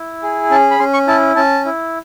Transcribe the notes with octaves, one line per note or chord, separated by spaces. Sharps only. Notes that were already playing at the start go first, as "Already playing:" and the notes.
Already playing: E4
G#4
C#4 A5
B5
C#4 C6
C#6
E4 A5
C#4 A5
E4